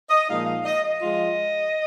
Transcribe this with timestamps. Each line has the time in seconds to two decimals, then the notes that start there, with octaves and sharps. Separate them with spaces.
0.10 D#5
0.28 A#2 F3 G#3 D#4 F5
0.46 F5
0.65 D#5
0.84 D#5
1.02 F3 G#3 F4